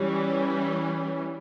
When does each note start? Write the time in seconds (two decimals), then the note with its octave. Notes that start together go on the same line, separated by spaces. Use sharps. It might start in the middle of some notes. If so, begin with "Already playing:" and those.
Already playing: E3 G3 C#4